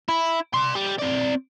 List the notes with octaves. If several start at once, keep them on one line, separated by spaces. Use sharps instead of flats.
E4
D5 C6
G3
C4 D5